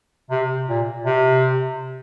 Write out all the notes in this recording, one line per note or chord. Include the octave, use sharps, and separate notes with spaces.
C3
A#2
C3